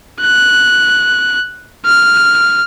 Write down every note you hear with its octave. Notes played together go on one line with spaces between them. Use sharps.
F#6
F6